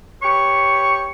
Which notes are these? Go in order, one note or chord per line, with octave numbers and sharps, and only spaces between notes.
G4 B4 C#5 C#6